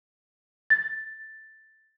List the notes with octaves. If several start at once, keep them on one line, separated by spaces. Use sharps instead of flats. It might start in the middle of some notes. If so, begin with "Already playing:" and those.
A6